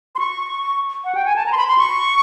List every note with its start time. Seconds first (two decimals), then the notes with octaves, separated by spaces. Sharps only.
0.15 C6
0.19 C#6
1.04 F#5
1.15 G5
1.26 G#5
1.36 A5
1.46 A#5
1.52 C6
1.57 B5
1.68 C6
1.78 C#6